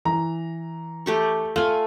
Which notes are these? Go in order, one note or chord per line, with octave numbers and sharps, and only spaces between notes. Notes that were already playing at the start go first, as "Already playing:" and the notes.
E3 A#5
A3 G4 C#6
A3 F4 G#5